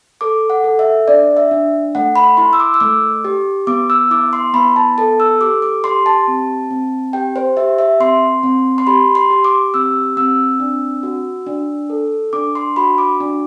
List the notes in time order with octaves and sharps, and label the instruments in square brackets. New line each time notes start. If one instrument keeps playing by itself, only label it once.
[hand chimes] A4 D6
F#5
A4
E5
D4 D5
E5
D4
A3 F#5
B5
E4 C6
E6
D6
E6
A3 D6
G4
B3 D6
E6
E4 D6
C6
B3 B5
A5
A4 A5
E6
G4 D6
D6
G4 C6
A5
C4
C4
G4 G5
C5
G4 E5
E5
C4 C6
C4
C6
G4 B5
C6
G4
D6
C4 E6
C4 E6
D4
F#4
D4
A4
D4 D6
C6
F#4 B5
D6
D4